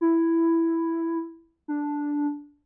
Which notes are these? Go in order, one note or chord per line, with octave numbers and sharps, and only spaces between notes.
E4
D4